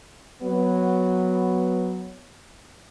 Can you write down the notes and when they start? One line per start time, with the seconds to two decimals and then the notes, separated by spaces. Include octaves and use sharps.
0.42 F#3 B3